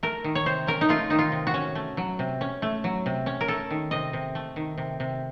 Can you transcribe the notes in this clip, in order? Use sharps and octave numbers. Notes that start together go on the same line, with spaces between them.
A3 A#4
D#3
C#5
C3 C5
C#4 A#4
D#4
A3 F4
D#3 D#4
F4
C3
F#4
C#4
A3
F#3
C3
C#4
A3
F#3
C3
C#4
A#4
A3 A4
D#3
C3 D#5
C3
A3
D#3
C3
C3